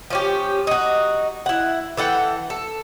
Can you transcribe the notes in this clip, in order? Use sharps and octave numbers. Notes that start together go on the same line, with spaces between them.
F3 C#4 G4
D#4 F#4
E4 F#5
E3 A4 F#5 G5
A4